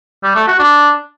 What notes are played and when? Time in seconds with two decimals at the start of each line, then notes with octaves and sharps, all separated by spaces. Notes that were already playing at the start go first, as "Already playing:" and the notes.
0.23 G3
0.35 A3
0.47 F#4
0.59 D4